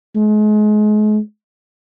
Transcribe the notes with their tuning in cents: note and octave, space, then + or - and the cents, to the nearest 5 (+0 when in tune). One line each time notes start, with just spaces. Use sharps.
G#3 +35